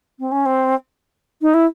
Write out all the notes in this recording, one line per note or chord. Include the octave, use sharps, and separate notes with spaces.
C4
C#4
C4
D#4
E4